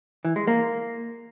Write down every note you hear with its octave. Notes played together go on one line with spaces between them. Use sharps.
E3
G#3
A#3